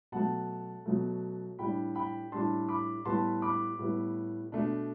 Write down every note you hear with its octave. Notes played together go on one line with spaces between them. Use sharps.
B2 F#3 A3 F#5 A5
B2 F#3 A3
A2 G3 D4 G5 B5
G5 B5
A2 G3 D4 A5 C6
B5 D6
A2 G3 B3 A5 C6
B5 D6
A2 G3 B3
B2 A3 D4